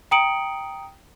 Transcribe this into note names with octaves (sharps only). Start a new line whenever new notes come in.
G5 A#5 D#6 C#7 D7 F#7